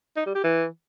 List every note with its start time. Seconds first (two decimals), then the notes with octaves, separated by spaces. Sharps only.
0.17 D#4
0.26 G3
0.35 G4
0.44 E3